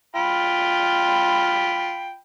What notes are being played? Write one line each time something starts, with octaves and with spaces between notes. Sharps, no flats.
F4 G5 B5